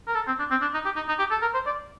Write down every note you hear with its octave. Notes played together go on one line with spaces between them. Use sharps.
A#4
A4
C4
D4
C4
D4
D#4
G4
D#4
D#4
G4
A4
A#4
C5
D5